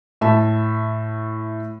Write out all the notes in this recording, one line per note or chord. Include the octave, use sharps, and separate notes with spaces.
A2 E5 A5